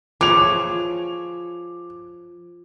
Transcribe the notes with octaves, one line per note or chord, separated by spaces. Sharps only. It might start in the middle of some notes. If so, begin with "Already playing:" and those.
F3 G#4 C#5 D6 F7